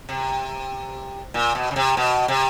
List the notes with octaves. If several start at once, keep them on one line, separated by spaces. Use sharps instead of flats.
C3
A#2
B2
C#3
C3
B2
C3